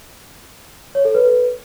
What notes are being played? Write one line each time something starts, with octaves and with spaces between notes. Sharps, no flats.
C#5
A4
B4